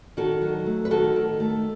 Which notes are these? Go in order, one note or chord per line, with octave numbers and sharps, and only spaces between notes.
D#3 F#4 A4
F#3
A3
B4
D#3 F#4 A4
D#3
A3